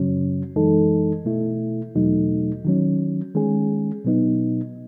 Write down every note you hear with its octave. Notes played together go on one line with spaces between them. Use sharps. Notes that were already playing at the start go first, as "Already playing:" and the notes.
Already playing: F#2 C#3 F#3 C#4
F#2 E3 G#3 D#4 A4
B2 A3 E4
E2 B2 F#3 A3 D#4
D#3 F#3 C#4
D#3 G#3 C#4 G#4
B2 F#3 B3 D#4